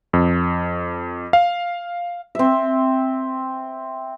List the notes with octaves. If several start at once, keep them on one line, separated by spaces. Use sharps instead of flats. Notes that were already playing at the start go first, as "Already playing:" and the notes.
F2
F5
C4 E5